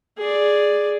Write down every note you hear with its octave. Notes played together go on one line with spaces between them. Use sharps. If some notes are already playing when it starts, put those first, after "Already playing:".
G#4 D5